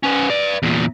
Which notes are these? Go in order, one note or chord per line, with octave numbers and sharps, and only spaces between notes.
B3 C#4
B4 D5
E2 A#2